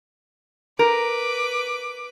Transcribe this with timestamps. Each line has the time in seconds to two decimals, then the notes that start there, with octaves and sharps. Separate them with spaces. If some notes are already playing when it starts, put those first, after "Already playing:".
0.79 A#4 B4 D6